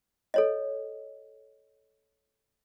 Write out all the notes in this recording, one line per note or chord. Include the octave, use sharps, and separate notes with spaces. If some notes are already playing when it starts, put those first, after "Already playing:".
A4 C#5 D#5